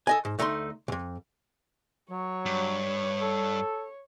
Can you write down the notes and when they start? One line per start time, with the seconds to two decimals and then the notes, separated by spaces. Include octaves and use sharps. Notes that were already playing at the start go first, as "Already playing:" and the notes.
0.07 A4 D#5 G#5
0.25 G#2
0.39 D2 A3 D#4 A#5 C6
0.88 B1 F2
2.11 F#3 C#5
2.46 G2
3.22 A4